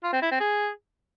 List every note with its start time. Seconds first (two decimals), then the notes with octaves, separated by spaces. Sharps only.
0.03 F4
0.13 C4
0.22 E4
0.31 C4
0.40 G#4